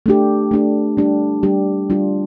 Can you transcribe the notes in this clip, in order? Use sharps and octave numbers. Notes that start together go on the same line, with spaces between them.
A3 D4 G4
A3 D4 G4
G3 D4 G4
G3 D4 G4
G3 D4 F4